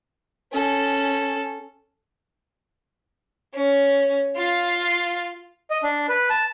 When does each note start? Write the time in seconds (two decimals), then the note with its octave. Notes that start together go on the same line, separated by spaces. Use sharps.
0.52 C#4 A4
3.55 C#4
4.37 F4 F5
5.70 D#5
5.83 D4
6.09 B4
6.30 A5